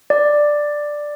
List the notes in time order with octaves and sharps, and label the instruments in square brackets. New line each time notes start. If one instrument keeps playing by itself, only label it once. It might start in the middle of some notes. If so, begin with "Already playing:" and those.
[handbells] D5